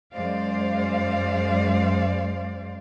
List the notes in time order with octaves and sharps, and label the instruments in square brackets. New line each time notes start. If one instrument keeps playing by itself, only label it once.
[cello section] F#2 G#3 C5 D5 F5